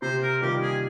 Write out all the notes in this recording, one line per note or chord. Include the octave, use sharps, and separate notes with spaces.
C3 C5
A#4
D#3 G3 A#3 F4 G4
G#4